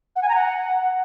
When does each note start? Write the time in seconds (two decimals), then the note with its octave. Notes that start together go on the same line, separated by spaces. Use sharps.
0.16 F#5
0.22 G#5
0.29 A#5
0.35 F#5